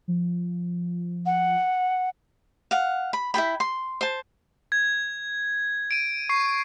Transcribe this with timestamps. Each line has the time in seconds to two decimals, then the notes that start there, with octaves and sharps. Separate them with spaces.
0.08 F3
1.25 F#5
2.71 F5 F#5
3.13 B5
3.34 E4 G#4 G5 B5
3.60 C6
4.01 C5 A5
4.72 G#6
5.91 D7 D#7
6.29 C#6 C7